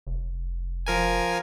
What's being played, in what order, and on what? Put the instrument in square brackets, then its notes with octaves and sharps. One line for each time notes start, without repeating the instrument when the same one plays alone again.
[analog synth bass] F1
[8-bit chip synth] F3 A#4 G#5